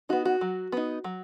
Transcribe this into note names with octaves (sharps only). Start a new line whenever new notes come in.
B3 D#4 F#4
F#4
F#3
B3 D#4
F#3